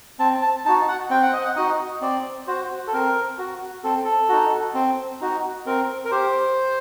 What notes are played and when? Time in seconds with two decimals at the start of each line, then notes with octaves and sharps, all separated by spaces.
0.19 C4 A5
0.42 A5
0.65 D#4 A5
0.68 F#4
0.88 F#5
1.10 C4 G5
1.22 F#5
1.33 D#5
1.44 F#5
1.56 D#4 F#4 D#5
2.02 C4 D5
2.47 F#4 C5
2.87 A4
2.93 C4 A#4
3.38 F#4
3.84 C4 A4
4.04 A4
4.29 D#4 F#4
4.74 C4
5.21 D#4 F#4
5.66 C4 A#4
6.05 A#4
6.11 G4 C5